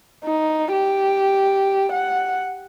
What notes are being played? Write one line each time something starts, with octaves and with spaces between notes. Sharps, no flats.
D#4
G4
F#5